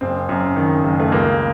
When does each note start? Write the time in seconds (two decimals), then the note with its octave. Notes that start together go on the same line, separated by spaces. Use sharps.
0.01 F#1 C4
0.29 F#2
0.56 D#3
0.84 F#1
1.00 A3
1.12 C#2 A#3